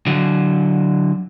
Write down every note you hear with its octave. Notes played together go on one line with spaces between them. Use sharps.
D3 F#3